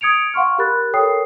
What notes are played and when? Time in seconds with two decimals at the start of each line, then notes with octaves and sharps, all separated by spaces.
0.01 D#6 G#6 C#7 D7 F7
0.34 F5 F#5 C6 C#6 F6
0.58 G4 A#4 B5 F#6 A6
0.93 A4 A#4 C#5 G5 D#6 C7